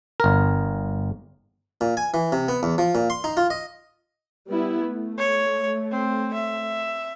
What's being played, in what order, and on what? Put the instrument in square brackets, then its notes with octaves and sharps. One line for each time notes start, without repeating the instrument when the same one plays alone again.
[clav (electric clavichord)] G1 A#4
[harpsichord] A#2
G#5
E3
C3
B3
E2
F3
A#2
C6
D#4
F4
D#5
[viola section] G3 B3 E4
A3
[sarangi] C#5
C4
E5